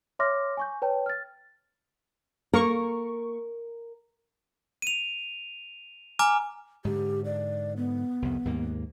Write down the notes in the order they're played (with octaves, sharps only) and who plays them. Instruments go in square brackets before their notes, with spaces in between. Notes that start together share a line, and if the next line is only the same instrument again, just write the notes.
[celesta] C#5 E5 C6 D6 F6 A#6
G#5 C#6 G6
B4 C#5 G5 A5
F6 A6
[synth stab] A#3 C#6 [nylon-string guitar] A#4
[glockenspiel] D#7 F7
G#5 A#5 D6 F6
[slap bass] G#2 D3 [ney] G4
[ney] D5
B3
[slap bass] C2 F2
D#2 G#2 A#3